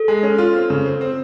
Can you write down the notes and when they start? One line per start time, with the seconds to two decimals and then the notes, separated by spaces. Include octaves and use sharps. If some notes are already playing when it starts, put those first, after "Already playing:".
Already playing: A4
0.08 G#3
0.23 C#4
0.38 F4
0.54 C4
0.70 C#3
0.86 C4
1.01 C4